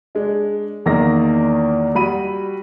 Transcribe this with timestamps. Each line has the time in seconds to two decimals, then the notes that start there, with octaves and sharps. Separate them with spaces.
0.15 G#3 D4
0.86 E2 D#3 A#3 A#6
1.95 G3 F#4 B5 D#7